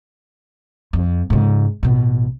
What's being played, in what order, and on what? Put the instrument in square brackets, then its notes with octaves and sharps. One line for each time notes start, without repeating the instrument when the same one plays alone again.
[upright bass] F2
G#2 C#3
A1 B2